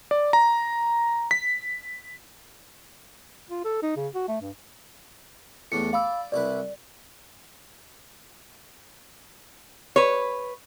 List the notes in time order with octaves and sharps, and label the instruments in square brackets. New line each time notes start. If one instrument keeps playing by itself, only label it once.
[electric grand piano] D5
A#5
B6
[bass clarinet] F4
A4
D#4
C#3
F#4
A3
G2
[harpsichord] E2 A2 D4 [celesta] C#7
[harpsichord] D5 [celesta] F5 B5 E6
[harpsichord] C2 E4 B4 [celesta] D5
[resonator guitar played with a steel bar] B4 C#5